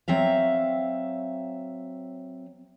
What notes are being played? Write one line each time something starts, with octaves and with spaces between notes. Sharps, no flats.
F#3 C4 E5 F5